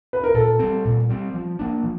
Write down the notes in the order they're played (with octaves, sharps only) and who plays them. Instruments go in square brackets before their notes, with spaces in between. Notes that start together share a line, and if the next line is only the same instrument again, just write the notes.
[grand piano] B4
A#4
[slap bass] A#2 [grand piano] A4
[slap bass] G3 C4
A#2
G3 C4
F3
A#3 D4
F3